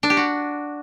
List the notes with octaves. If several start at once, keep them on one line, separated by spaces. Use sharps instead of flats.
D4
G4
F#4